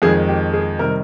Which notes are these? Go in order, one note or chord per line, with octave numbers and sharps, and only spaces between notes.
F2 D#3 G#3 G#4
G4
G#4
C3 D#3 G3 A#4